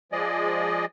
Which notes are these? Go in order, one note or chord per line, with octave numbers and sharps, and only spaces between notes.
F3 G#3 G#4 D5 D#5